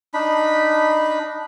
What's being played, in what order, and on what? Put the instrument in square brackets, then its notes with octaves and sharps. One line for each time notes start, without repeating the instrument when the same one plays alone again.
[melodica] D4 D#4 B5